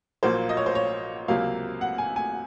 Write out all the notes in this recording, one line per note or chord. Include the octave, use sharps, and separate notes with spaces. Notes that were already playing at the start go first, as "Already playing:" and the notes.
A#1 A#2 F#3 A#3 C5
D#5
C#5
C5
C#5
C#2 C3 F#3 A#3 F5
F#5
G#5
G#5